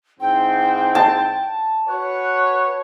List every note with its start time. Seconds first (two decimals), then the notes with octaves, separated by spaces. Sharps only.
0.20 G#2 E3 C4 G5
0.95 A5
1.89 F#4 B4 C#5 F#6